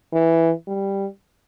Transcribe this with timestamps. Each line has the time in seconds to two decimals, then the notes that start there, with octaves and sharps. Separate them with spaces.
0.13 E3
0.68 G3